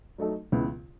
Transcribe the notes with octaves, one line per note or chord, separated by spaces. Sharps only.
F#3 A3 D#4 A4
C#2 C#3 E3 B3